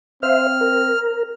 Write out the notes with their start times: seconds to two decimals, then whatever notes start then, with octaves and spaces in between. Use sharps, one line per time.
0.23 C4 C5 E5 F5 F6
0.61 A#4